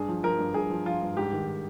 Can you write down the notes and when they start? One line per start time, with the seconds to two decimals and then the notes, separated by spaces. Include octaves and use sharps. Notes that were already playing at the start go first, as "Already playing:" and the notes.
Already playing: G2 G#4
0.09 F3
0.23 F3 A#4
0.39 G2
0.54 G2 G#4
0.70 F3
0.86 F3 F4
1.02 G2
1.17 G#2 G4
1.33 D#3